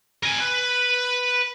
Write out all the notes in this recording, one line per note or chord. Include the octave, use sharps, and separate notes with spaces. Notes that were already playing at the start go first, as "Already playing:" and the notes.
A#4 G#5
B4